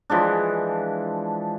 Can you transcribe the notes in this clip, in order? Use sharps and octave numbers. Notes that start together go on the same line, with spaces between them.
E3 F3 G#3 D4